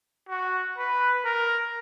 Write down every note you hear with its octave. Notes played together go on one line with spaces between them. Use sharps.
F#4
B4
A#4